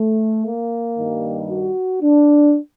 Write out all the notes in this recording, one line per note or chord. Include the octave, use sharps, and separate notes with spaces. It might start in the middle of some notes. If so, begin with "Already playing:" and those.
Already playing: A3
A#3
G2 D#3 G3
F#4
D4